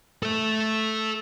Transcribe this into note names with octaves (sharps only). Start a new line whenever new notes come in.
A4 E5